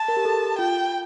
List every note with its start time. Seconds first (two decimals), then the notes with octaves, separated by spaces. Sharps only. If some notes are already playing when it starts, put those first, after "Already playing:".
Already playing: A5
0.08 A#4
0.17 G4
0.25 A4
0.58 F4 G5